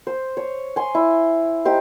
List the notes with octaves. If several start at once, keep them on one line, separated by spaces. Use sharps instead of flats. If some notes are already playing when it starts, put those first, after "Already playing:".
C5
C#5
G#5 C6
E4
D#4 G4 C5